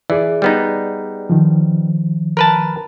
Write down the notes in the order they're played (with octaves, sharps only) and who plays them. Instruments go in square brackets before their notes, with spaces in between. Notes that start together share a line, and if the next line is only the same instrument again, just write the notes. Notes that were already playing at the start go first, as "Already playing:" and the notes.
[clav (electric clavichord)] E3 [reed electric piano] G#4 D5
[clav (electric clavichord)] G3 B3 D#4
[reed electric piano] D#3 F3
[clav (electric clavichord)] A#4 B4 A5